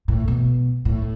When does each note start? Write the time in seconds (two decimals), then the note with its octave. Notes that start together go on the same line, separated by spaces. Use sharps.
0.08 A2
0.28 B2
0.85 A2